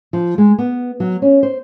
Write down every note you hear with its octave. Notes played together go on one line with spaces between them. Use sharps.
F3
G#3
B3
F#3
C#4
C5